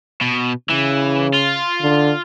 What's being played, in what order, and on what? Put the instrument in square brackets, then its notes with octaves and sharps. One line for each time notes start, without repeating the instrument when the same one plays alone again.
[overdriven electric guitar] B2
[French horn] C#3 [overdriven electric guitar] E3
[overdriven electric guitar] F4
[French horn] D3